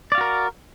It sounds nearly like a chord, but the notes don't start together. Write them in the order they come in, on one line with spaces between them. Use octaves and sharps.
D5 F5 F#4 A#4